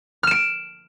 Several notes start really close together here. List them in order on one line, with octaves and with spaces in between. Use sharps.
F6 E7 D7